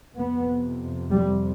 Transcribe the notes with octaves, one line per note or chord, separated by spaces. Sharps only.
F2 C3 B3
G3